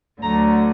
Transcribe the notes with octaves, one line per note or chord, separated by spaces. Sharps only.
D2 D3 F#3 A3 A#5